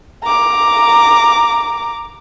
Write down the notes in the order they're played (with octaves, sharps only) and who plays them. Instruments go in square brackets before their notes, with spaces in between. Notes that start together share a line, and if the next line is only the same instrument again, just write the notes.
[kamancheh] A#5 D6